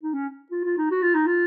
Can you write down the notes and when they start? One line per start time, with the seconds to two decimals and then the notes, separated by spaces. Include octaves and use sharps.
0.03 D#4
0.13 C#4
0.51 F4
0.64 F4
0.77 D#4
0.91 F#4
1.02 F4
1.15 D#4
1.27 F4